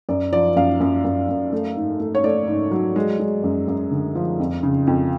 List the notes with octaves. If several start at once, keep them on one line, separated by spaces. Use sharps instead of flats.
F#2 D5
F3 D5
F#2 F5
F#2
F#2
F#2
A3
G#2
A3
C#5
A3 D5
G#2
F#3
G#3
G#3
F#2
F#2
D3
F3
F2
C#3
F2